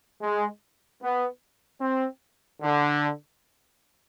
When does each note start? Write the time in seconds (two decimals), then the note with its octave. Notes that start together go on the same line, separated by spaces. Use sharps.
0.21 G#3
1.02 B3
1.81 C4
2.62 D3